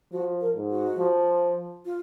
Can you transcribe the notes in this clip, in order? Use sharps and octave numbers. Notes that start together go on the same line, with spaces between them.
F3 F#4
A#4
G#2
F#4
F3
F4